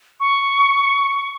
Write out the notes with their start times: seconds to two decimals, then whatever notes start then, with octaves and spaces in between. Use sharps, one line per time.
0.20 C#6